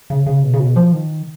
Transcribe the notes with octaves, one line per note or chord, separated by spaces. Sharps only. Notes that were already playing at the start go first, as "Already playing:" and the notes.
C#3
C#3
B2
C#3
B2
F3
D#3